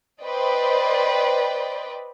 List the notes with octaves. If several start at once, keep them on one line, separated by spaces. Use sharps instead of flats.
B4 C5 D5 D#5 G5